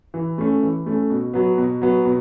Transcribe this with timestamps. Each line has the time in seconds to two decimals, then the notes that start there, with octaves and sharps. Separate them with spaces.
0.14 E3
0.38 A3 C#4
0.63 E3
0.86 A3 C#4
1.10 B2
1.33 F#3 B3
1.58 B2
1.82 F#3 B3
2.05 B2